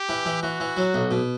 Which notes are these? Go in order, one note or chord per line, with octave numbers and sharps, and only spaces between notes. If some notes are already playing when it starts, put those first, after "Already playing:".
Already playing: G4
E3
E3
E3 F#4
E3
F#3
B1
B2